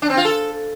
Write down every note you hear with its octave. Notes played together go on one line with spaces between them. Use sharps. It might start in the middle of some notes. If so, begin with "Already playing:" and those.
D4
C4
F4
A4